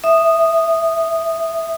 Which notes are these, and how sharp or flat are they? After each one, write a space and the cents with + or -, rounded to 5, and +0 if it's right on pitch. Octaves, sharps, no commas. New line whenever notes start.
E5 +0 D#6 -10